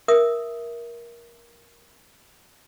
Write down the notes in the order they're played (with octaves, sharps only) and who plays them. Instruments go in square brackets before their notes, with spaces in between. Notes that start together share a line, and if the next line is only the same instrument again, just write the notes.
[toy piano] A#4 E5 D#6